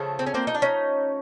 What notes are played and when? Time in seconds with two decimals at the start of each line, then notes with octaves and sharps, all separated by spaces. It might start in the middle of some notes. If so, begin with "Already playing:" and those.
Already playing: C#3 F3 A3
0.19 C4
0.26 C#4
0.34 A#3 C4
0.47 D#4
0.55 D4
0.62 C#4 D#4